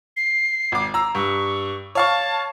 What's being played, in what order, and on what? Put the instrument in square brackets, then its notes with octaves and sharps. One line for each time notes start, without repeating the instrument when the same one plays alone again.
[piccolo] C7
[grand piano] G#1 D6
A#5 E6
[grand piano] G2 [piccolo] C#6
[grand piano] C#5 F5 C#6 [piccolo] A5